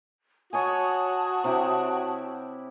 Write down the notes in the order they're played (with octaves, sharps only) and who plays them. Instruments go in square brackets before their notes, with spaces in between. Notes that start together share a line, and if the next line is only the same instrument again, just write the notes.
[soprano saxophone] F#4 [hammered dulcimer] C#5 D#5 G#5 [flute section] A5 D#6
[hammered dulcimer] C3 E4 G4